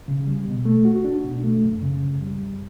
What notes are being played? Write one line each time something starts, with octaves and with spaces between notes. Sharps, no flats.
C#3
G3
B2
A3
F#4
D4
B2
A3
F#2
C#3
F#2
G3
F#2